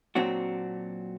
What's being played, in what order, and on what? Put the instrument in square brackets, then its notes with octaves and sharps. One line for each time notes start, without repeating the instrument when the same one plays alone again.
[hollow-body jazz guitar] A#2 F#3 C4 D4 F#4